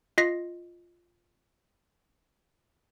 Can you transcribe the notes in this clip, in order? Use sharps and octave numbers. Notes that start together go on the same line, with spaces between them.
F4 D#5 A#6 C7